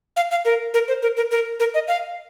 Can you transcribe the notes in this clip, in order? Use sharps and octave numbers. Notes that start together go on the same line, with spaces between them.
F5
F5
A#4
A#4
C5
A#4
A#4
A#4
A#4
D#5
F5